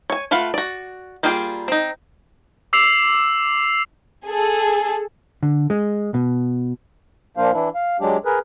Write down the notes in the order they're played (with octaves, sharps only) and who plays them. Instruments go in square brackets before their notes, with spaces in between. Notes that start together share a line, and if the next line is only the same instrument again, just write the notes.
[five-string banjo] C#5 G#5
A3 F4 B4 F5 F#5
F#4 D5
G3 A#3 F4 G#4 G5
C4 D#4
[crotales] D6 E6 C7 F7
[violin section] G#4 A4
[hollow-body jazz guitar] D3
G#3
B2
[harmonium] A#2 F3 A#3 D4 C5 F5
E3 D4 E4
F5
F#3 G#3 D4 G4
G#4 A#4 B4